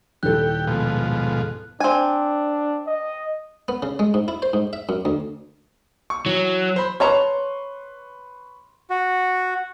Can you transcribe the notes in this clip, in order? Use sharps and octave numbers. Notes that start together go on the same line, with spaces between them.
D#1 E4 G4 A4 F#6
G#2 B2 F3
C4 D4 G#5
D#5
B3
C#3
G#3
G#2
E4
C5
G#2
E5
F#2
D2
C#6
E3 F#3
C5 B5 C6
B4 C#5 A5 A#5 C6 C#6
F#4